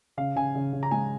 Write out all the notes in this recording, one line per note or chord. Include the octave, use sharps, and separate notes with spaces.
C#3 F5
C#3 G#5
C#3
C#3
A#5
G#3 G#5